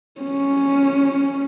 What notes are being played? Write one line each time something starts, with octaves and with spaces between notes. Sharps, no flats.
C#4